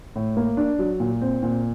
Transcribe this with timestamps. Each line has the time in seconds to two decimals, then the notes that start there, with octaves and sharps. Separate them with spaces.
0.16 A2
0.37 A#3
0.57 D4
0.79 F#3
1.00 A#2
1.21 C4
1.43 A#2